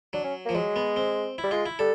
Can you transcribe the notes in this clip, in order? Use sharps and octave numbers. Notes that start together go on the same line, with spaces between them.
F#3 D4
C#4
F3 A#3
F#3 G#3
B3
C4
E4
G3
G#3 F4
E4
G3 A4